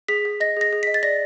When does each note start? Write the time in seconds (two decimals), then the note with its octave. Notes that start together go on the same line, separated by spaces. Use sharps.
0.09 G#4 B6
0.25 G#4
0.40 D#5 A#6
0.57 G#4 A#6
0.73 G#4
0.83 D#5 B6
0.94 A6
1.03 D5 A#6